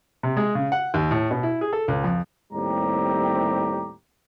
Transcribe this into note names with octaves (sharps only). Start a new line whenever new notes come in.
C3
G#3
C#3
F#5
D#2
A2
B2
E4
G#4
A4
C#2
F2
D#2 A2 G3 C4 G4 A#5